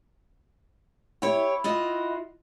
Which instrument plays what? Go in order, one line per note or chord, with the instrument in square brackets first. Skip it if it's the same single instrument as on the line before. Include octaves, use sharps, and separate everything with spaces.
[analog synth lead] E4 [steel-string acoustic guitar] G4 C#5
[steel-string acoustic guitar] F4 F#4 D#5